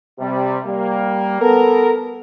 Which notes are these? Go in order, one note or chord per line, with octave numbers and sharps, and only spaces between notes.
C3 G3
G3 A#3
B3 A4 A#4